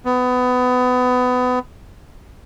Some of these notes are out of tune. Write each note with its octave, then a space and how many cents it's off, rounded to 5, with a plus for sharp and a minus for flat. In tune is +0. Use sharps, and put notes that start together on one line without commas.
B3 +25